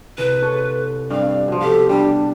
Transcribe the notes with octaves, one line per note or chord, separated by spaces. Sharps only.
C2 B4
A4 C#5
G2 C4 D5 F5 F6
B2 F3
G4 A4 F5
G3 D4